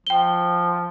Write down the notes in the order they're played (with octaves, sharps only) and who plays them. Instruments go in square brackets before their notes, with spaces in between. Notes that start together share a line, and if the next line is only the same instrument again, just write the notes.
[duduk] F3 [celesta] G5 G7